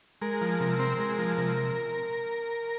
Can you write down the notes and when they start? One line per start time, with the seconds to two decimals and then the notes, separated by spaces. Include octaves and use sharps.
0.21 G#3 A#4
0.41 F3
0.60 C3
0.79 C4
0.99 G#3
1.19 F3
1.38 C3